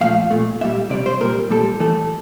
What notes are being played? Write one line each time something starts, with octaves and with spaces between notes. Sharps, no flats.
A#2 F3 A3 F5
A#2 A3
A#2 G3 E5
C3 G3 D5
C5
A#2 G3 A#4
A#2 G3 A4
A2 E3 A3 A4